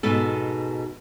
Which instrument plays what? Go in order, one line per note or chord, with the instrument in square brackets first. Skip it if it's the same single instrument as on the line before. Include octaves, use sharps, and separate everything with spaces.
[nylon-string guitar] G#2 B2 A4